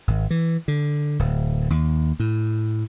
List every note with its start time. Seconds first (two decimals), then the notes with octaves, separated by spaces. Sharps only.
0.08 G#1
0.30 E3
0.68 D3
1.19 D1
1.70 D#2
2.20 A2